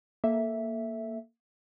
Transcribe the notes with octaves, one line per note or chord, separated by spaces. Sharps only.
A#3 A4 E5